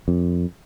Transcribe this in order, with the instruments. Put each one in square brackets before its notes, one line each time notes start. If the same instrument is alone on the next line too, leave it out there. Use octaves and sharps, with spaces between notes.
[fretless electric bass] F2